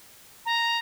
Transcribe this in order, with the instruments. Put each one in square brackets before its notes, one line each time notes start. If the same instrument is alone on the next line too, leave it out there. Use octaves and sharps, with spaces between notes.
[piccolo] A#5